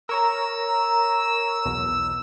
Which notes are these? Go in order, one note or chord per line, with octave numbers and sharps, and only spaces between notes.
A#4 C#5 A#5 E6
B1 E2 B2